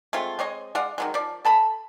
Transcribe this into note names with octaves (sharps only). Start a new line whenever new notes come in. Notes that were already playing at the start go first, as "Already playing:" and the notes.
G#3 A3 C4 F4
G#3 C4 C#5 D#5
G#3 D5 F5 F#5
D#3 F#3 G#3
F3 D5
A4 A5 B5